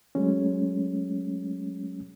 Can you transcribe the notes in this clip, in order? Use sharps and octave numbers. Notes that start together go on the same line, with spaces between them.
F#3 G#3 A3 C#4